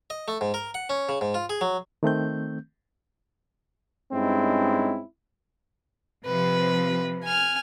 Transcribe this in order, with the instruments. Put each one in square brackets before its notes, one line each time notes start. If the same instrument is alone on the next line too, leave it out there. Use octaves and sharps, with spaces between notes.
[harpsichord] D#5
A3
G#2
A#4
F#5
C#4
C#3
G#2
F4
G#4
F#3
[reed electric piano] D#3 A3 C4 G6
[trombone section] G2 G#3 C4 C#4 D#4 E4
[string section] C3 F3 [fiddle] B4
[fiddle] G#5 F6